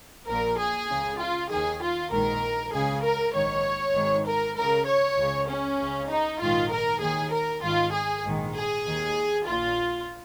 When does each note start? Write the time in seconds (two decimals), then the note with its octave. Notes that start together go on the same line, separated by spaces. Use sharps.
0.27 A#1 A#2 A#4
0.59 G#4
0.89 C#2 C#3
1.19 F4
1.50 D#2 D#3 G#4
1.81 F4
2.11 A#1 G#2 D#3 A#4
2.73 C#2 C#3 G#4
3.03 A#4
3.34 A#1 G#2 D#3 C#5
3.95 G#1 G#2 D#3
4.26 A#4
4.56 C#2 C#3 A#4
4.86 C#5
5.17 C#2 C#3
5.49 C#4
5.79 C#2 C#3
6.09 D#4
6.40 A#1 G#2 D#3 F4
6.71 A#4
7.01 D#2 D#3 G#4
7.32 A#4
7.63 G#1 G#2 D#3 F4
7.93 G#4
8.23 A#1 G#2 D#3
8.55 G#4
8.85 D#2 D#3
9.46 A#1 A#2 F4